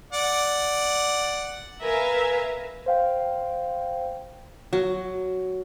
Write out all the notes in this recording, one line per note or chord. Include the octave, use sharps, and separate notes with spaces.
D5 F#5
A#4 B4 E5 F5 G#5 A#5
C5 F5 G5
F#3